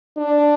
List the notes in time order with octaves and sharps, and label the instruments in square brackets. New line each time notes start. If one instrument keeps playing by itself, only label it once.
[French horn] D4